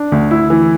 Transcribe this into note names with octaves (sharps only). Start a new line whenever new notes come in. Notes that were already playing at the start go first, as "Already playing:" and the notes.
Already playing: D4
D2
E4
E3